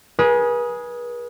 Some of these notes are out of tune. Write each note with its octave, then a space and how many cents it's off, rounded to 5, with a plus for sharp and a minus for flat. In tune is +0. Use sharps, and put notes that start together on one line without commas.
G#4 +5 B4 -40